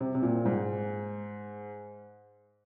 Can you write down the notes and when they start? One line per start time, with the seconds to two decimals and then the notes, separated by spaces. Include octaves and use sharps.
0.01 C3
0.15 C3
0.22 A#2
0.45 G#2